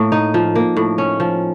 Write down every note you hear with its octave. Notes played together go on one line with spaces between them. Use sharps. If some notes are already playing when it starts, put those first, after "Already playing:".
Already playing: A2 A#3
D#4
F3
A#3
A2
C#4
F3